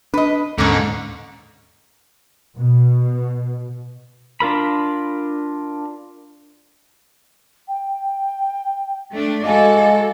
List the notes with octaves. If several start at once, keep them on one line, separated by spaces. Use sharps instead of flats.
D4 B4 D#5
D#2 G#2 D3 C#4
B2
D4 F4 A#4 B5
G5
A3 D4
G#3 F#4 A4 D#5 F5 G#5 D6